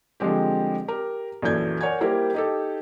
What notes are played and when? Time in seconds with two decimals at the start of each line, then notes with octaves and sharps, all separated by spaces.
0.20 D3 F3 G3 G#3 C4 G4
0.88 G4 A#4
1.42 A#1 F#2 E3 A4 G6 G#6
1.81 A#4 C#5 D5 F#5 G#5 G#6
2.00 G3 A#3 E4 G4 A#4 C5
2.35 D#4 G4 A4